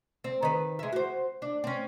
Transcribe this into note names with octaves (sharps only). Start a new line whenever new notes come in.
C4
D#3 B4
G#3 E5
F#4 C5
D4
C4 C#4